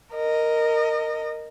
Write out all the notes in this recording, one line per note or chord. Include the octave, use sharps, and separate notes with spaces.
A#4 D#5